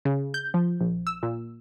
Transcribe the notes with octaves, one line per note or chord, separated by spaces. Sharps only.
C#3
G6
F3
A#1
E6
A#2